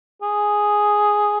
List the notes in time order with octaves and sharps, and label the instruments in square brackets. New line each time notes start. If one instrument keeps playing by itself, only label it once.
[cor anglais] G#4